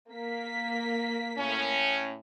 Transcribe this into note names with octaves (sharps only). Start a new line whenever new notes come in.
A#3 B6
A2 C#4